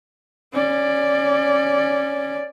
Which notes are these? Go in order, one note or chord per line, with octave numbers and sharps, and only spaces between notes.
C#4 D5